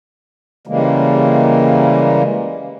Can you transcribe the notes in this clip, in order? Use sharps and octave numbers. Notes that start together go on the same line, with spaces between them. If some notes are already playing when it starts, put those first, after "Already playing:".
C#3 E3 G3 G#3 A#3